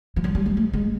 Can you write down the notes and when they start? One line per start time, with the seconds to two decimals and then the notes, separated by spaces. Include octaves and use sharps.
0.16 F3
0.24 F#3
0.35 G3
0.46 G#3
0.57 A3
0.73 G#3